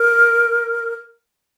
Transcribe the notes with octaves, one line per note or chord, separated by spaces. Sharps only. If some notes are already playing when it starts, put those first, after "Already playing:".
Already playing: A#4